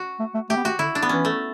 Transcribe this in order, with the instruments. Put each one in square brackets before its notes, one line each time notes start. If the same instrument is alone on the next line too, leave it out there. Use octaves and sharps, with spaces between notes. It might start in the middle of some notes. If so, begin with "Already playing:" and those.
Already playing: [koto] F#4
[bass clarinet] A3
A3
[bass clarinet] A3 [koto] G4
[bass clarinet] B3
[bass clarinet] A3 [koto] F#4
[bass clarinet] D3 [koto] E4
[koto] D4
B3
[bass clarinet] E3 [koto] C#4
[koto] A3